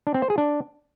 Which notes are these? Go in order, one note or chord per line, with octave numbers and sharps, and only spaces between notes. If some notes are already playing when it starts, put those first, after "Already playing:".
D4
C4
C5
G#4
D4